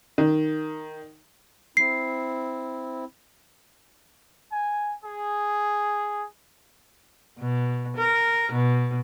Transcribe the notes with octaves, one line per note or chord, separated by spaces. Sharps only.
D#3
C4 E4 C7
G#5
G#4
B2
A#4
B2